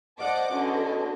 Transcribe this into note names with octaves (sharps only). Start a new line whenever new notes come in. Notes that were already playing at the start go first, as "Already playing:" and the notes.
C5 D5 D#5 F#5 A5 D6
E2 D3 C#4 F#4 D#5